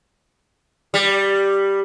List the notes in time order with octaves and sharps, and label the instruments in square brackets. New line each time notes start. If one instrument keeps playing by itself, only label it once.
[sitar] G3